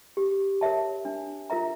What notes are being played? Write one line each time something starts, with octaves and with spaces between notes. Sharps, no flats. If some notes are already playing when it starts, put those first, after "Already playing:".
G4
A#4 C#5 E5 A5
D4
F4 A#4 E5 A#5